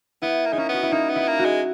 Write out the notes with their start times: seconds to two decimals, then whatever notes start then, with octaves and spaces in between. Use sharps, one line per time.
0.22 B3 E4
0.46 A#3
0.52 G#3 D#4
0.57 A#3 C#4
0.69 B3 F#4
0.83 E4
0.92 A#3 D#4
1.09 B3
1.16 E4
1.28 A#3
1.39 F#4
1.45 G#3